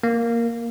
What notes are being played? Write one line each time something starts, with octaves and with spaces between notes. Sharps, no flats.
A#3